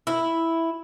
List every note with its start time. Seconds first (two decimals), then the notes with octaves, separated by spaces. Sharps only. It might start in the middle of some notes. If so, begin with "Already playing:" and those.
0.07 E4